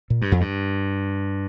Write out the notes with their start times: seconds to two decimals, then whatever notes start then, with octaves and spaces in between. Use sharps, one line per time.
0.10 A#2
0.22 G2
0.32 F2
0.41 G2